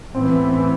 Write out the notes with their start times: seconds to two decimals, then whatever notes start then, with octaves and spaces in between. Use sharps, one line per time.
0.14 A2 E3 B3 C4
0.49 C4